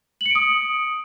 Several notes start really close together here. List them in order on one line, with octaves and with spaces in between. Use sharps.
F#7 C#7 D7 D#6